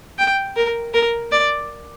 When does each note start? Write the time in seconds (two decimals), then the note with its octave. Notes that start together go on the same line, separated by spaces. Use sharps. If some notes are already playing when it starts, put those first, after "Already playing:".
0.19 G5
0.56 A#4
0.94 A#4
1.32 D5